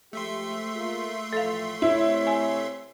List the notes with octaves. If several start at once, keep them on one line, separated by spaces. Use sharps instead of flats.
F3 G#3 A3 G4 E5 C6
A#3 F4 G#4
A2 E3 F3 A4 F5
C3 E4 C#5
G#5